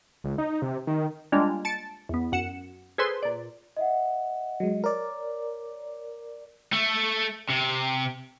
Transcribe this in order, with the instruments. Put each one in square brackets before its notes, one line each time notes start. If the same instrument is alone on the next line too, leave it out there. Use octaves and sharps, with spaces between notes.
[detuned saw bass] C#2
D#4
C3
D#3
[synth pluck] G3 G#3 A#3 D4 F4
A5 A6 C#7 D7
E2 B3
F#2 F#5 C#7 E7
G#4 A4 B4 C5 C6
A#2 D5
[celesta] D#5 E5 F#5
[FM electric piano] F#3 G#3 [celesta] D#5
[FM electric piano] A#4 D5 [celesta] C#5
[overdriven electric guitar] A3
C3